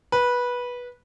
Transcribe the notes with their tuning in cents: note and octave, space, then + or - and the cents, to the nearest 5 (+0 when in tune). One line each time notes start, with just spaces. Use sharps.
B4 -15